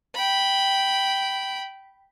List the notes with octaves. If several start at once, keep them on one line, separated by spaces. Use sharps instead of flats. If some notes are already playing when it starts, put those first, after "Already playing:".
G5 B5